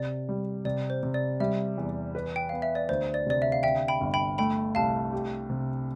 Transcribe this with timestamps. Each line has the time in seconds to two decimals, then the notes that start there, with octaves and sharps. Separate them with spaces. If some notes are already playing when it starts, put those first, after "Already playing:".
Already playing: C3 D5
0.29 G3
0.65 C3 D5
0.90 C5
1.03 C3
1.14 D5
1.40 G3 E5
1.78 E2
2.15 B4
2.36 G5
2.49 B3 F5
2.62 E5
2.75 D5
2.89 D2 C5
3.14 D5
3.26 C3 D5
3.42 E5
3.52 F5
3.63 D3 E5 G5
3.88 G5 B5
4.01 G1
4.14 G5 B5
4.38 A3 G5 B5
4.75 C2 F5 A5
5.13 G4
5.50 C3